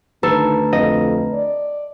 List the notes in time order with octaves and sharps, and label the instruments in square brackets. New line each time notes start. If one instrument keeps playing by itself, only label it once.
[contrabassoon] D2 [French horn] D#3 [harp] A4 [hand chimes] B4 A#5
[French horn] F2 [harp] D#5
[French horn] D5